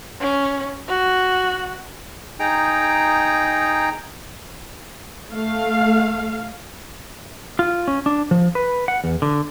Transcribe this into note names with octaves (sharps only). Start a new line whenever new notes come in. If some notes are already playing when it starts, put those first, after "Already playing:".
C#4
F#4
D#4 G#4 G5 A#5
A3 F5
F4
C#4
D4
F3
B4
F#5
E2
D3